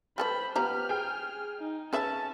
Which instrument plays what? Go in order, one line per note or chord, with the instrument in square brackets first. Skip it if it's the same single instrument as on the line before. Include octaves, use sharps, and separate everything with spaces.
[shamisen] G3 A4 B4 [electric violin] C5 B5
[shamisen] F3 C5 A#5 [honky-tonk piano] B3 G4 [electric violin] F6
[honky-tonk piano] G#4 G5
[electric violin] D#4
[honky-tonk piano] C#4 [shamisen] G#4 B4 E5 [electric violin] A5